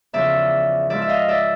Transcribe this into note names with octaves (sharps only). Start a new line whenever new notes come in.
E2 C#3 F3 D5 E5
G#2 F3 D5 E5
E5
D#5 F5
D5 E5